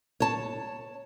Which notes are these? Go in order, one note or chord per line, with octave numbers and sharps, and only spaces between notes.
C#5 A5